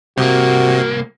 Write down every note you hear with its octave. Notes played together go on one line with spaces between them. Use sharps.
C2 C3 A#3 F#4